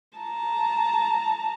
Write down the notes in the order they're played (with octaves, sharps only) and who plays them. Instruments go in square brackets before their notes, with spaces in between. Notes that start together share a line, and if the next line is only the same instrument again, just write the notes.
[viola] A5 A#5